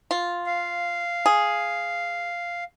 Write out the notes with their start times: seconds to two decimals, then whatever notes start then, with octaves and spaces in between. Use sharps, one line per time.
0.11 F4
0.46 F5
1.26 G#4